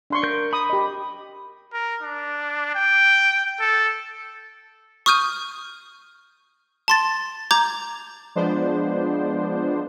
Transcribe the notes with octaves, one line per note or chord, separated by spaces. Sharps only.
D4 C6 C#6
A#4 G6
A#5 B5 D#6
G4 D#5
A#4
D4
G5
A4
C#6 D#6 F6 G6 D#7
A5 C6 A6
A#5 D6 G6 G#6
F3 G#3 B3 D4 C5